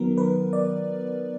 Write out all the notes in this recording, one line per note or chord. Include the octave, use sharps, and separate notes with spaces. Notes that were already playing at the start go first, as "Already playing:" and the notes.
Already playing: D#3 F#3 B3 A#4
B4
D5